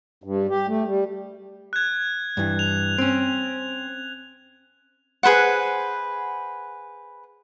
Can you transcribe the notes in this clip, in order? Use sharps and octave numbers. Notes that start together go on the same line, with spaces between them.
G2
G4
A3
G3
F#6 G#6
G2 E3
F7
C4 C#4
G#4 B4 C5 F#5